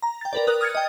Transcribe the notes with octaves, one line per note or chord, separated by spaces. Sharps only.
A#5
G5 A6
A#4 B4 D5
A#4 D#6 F#6
D#6 F6 G#6 A6 C#7
D#5 G5